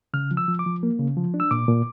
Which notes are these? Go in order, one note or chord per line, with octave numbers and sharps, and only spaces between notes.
C#3 F6
F3
E6
F3
D6
F3
A#3
C#3
F3
D4
E6
A#2 D6
A#2